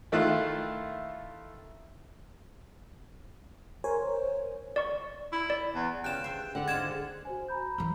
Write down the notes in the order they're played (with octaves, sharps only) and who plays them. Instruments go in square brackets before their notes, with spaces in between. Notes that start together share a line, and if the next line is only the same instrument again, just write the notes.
[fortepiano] D#3 A3 E4 F4 F#6
[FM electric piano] A#4 C5 C#5 G#5
[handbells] D5 C#6
[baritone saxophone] E4
[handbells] D5
[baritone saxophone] E2
[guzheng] G2 C#3 F4 [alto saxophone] G5 [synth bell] F#6 E7
[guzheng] C5 E5
[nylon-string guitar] D3 [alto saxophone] F#5
[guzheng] G#2 G#3 F4 [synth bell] G#6 E7
[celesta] F#4 C5 G#5
A#5 B5 G6
[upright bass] E3 F#3